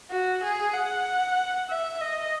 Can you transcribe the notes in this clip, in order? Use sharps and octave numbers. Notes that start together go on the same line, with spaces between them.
F#4
G#4
F#5
E5
D#5